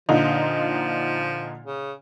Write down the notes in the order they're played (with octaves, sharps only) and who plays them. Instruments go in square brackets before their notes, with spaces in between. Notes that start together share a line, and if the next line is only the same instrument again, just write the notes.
[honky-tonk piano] A#2 D3 D#4 [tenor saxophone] F3
[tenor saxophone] C#3